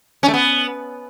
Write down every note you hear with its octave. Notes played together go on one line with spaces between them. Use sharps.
C#4
A3
B3